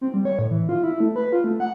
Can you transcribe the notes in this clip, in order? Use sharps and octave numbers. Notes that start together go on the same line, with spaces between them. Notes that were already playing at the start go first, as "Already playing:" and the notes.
C4
G3
C#5
A2
E3
F4
E4
A3
B4
F4
A3
F#5